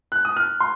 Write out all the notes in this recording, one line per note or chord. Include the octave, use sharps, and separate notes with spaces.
F#6
D#6
F6
C6